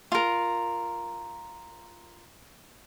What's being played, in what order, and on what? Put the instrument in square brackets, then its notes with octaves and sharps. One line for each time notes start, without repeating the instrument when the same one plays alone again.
[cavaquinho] F4 A#4